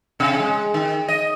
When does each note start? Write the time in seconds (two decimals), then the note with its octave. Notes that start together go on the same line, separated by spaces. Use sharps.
0.20 C3
0.40 G#3
0.74 D#3
1.08 D#5